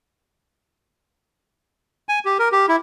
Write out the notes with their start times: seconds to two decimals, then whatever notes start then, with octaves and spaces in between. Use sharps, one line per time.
2.09 G#5
2.25 G4
2.39 A#4
2.52 G4
2.68 E4